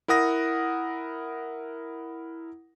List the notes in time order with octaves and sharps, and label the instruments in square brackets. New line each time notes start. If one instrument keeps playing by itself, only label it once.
[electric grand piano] E4 A#4 F#5 D#6 A#6